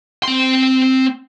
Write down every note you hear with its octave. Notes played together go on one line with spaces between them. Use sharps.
C4 C6